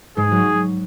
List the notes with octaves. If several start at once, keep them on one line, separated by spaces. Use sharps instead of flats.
G#2 G#3 G#4
F#3